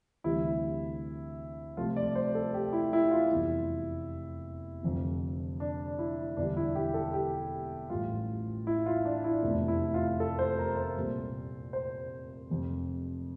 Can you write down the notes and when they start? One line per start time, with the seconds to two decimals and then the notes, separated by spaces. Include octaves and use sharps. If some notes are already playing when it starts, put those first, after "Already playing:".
0.24 D2 C3 E3 G3 E4
1.77 C2 C3 F3 A3 F4
1.96 D5
2.15 C5
2.35 A4
2.54 G4
2.73 E4
2.93 E4
3.11 F4
3.30 F1 E2 E3 G3 E4
4.83 F1 F2 D3 F3
5.60 D4
5.98 E4
6.37 E1 E2 D3 G3 D4
6.57 E4
6.75 G4
6.94 A4
7.13 G4
7.90 A1 A2 G3 F4
8.67 E4
8.86 F4
9.05 D4
9.24 E4
9.43 F1 E2 E3 A3
9.68 E4
9.94 F4
10.20 A4
10.39 C5
10.59 A#4
10.77 C5
10.97 C2 A#2 G3
11.73 C5
12.50 F1 F2 C3